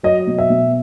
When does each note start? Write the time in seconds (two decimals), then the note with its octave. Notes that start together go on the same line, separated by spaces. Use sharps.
0.03 F#3 D#5
0.27 B2
0.38 E5
0.50 B2